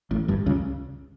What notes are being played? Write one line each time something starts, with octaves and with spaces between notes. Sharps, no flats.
A1 A2
G1 G2
C#2 C#3